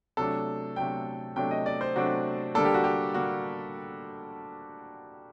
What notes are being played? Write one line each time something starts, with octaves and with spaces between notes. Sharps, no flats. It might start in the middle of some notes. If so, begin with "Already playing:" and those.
C3 F#3 A3 D4 A4
C3 F#3 A3 D4 G5
C3 F#3 A3 D4 G5
D#5
D5
C5
C3 F#3 A3 D4 F#4
D3 G3 A#3 D4 A4
G4
F#4
G4
D3 G3 A#3 D4 F#4